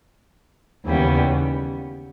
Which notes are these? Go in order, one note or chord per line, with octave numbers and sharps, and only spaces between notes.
D#2 C#3 E3 G3 B3